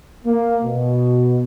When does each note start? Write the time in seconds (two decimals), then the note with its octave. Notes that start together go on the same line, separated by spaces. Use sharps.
0.23 A#3
0.63 B2